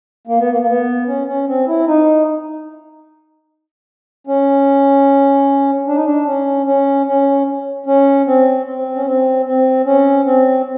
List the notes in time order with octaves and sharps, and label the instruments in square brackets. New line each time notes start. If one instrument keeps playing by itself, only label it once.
[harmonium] A#3
B3
A#3
A#3
B3
C#4
C#4
C4
E4
D#4
C#4
D4
D#4
D4
C#4
C#4
C#4
C#4
C4
C4
C#4
C4
C4
C#4
C4